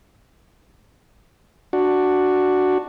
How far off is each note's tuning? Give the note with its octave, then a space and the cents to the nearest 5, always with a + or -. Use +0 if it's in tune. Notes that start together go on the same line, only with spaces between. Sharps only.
D4 +5 F#4 +0